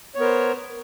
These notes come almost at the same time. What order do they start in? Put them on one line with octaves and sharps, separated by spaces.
C#5 B3 A#4 C5